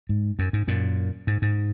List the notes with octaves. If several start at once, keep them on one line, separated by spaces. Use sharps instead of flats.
G#2
F#2
G#2
F#2 A#2
G#2
G#2